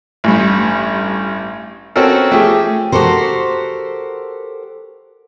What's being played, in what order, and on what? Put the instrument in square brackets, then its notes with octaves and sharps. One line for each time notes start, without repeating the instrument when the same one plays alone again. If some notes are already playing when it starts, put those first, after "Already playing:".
[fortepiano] A1 G2
C4 C#4 F#4 A4 A#4
F3 A3 G4 G#4
[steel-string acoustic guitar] F#4 G4 A4 A#4 C5